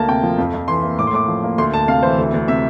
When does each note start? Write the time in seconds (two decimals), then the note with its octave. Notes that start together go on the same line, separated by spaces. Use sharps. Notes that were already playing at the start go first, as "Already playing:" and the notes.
Already playing: D2 A#3 A5
0.08 C3 G5
0.23 F3
0.38 F2
0.54 F2
0.68 E3 C6
0.83 A#3
0.99 A2 D6
1.07 C6
1.13 A2 D6
1.28 F3
1.44 A#3
1.58 D2 C6
1.73 D2 A5
1.88 C3 F5
2.03 E3 C5
2.18 D2
2.34 D2
2.48 C3 E5